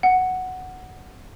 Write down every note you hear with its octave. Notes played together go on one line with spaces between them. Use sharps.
F#5